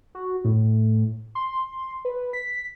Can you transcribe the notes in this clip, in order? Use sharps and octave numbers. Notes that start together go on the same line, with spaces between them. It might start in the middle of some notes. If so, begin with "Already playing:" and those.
F#4
A2
C6
B4
B6